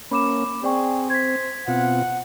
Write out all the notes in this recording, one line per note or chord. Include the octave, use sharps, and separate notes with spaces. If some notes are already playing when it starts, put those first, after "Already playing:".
A#3 C#4 B5 D6 E7
C4 G#4 D5 G5 C#6
C5 G#6 B6
B2 C4 F4 F#5